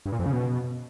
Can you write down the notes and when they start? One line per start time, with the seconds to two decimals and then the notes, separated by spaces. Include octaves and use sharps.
0.06 G2
0.12 A#2
0.19 F2
0.26 C#3
0.33 B2